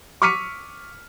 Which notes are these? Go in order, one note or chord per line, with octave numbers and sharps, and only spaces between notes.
C#6 D6 F6 B6 C#7 D#7